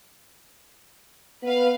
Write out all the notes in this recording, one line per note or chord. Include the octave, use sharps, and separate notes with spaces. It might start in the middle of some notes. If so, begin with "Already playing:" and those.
B3 B4 F5